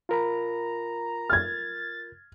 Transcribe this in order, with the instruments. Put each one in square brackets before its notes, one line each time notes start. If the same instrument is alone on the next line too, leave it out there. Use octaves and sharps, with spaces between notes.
[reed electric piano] F4 A#4 B5 [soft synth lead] A#5
[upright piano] F6 G#6 [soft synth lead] A6